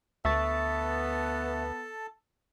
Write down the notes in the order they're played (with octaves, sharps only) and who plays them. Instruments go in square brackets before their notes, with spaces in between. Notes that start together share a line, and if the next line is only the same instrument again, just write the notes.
[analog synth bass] D2 [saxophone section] B3 [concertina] A4 A5 [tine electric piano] E5 C#6 A6